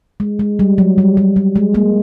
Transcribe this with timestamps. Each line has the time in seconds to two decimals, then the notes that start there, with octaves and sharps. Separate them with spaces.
0.20 G#3
0.39 G#3
0.59 G3
0.78 F#3
0.98 G3
1.17 G3
1.36 G3
1.56 G#3
1.74 G#3 A#3